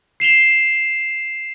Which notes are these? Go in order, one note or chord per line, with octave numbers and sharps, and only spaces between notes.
C7 E7 F7 G7